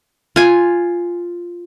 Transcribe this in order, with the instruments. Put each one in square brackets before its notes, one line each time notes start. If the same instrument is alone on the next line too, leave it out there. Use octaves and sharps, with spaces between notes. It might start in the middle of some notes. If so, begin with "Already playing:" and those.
[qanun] F4 G#5